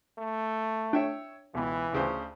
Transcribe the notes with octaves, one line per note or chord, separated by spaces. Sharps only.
A3
D4 C#5 E5 G5
C#2 B2 E3
D2 C#3 C5